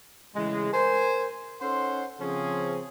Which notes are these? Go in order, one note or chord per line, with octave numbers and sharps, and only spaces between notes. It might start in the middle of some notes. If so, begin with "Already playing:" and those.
A2 C#3 E3 G#3
A#4 C5 G#5
C#4 D#4 A4 C5 F#5 C6
C#3 F3 C4 C#4 G#4